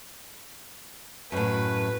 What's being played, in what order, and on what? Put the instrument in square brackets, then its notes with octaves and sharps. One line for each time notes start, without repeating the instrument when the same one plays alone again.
[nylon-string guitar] F#2 A2 [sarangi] B4